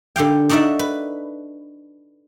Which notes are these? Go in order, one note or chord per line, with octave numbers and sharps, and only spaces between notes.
D3 G4 F5 G5
D4 D#4 F#4 A4 D5 E5
B4